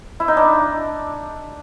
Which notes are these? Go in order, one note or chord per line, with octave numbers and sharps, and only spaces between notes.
E4
D#4
D4